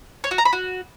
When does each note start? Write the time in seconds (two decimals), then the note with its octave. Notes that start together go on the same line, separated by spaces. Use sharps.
0.24 C#5
0.31 F#4
0.38 A#5
0.45 B5
0.53 F#4